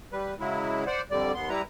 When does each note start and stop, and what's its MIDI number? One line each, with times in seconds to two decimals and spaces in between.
0.12 0.34 55
0.12 0.34 71
0.40 0.84 49
0.40 0.84 54
0.40 0.84 56
0.40 0.84 64
0.87 1.01 72
0.87 1.01 74
0.87 1.01 78
1.11 1.32 41
1.11 1.32 50
1.11 1.32 55
1.11 1.32 74
1.34 1.49 39
1.34 1.49 59
1.34 1.49 84
1.49 1.61 55
1.49 1.61 64
1.49 1.61 71
1.49 1.61 82